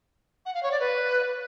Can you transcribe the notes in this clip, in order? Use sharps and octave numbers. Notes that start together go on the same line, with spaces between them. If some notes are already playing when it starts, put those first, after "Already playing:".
F#5
F5
C#5
D5
B4